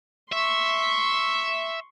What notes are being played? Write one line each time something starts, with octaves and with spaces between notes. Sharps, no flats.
E5 C6 C#6